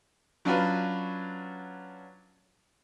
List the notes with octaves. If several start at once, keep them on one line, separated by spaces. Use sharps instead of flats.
F#3 C#4 D4 F4 F#4 B4